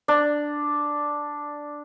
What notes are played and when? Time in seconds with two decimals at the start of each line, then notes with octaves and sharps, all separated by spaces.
0.08 D4